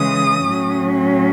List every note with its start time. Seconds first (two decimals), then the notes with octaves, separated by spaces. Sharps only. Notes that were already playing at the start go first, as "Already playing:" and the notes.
Already playing: C#3 E3 G#3 D#6
0.44 A2 F#3 C#4